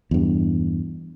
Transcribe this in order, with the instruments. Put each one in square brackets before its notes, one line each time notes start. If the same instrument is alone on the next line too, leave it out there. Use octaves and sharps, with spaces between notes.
[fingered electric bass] E2 G2